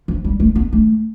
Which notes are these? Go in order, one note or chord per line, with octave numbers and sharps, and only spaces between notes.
F3
G3
A3
B3
A3